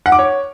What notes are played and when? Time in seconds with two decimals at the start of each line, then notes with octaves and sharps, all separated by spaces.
0.06 F#5
0.12 D6
0.19 C#5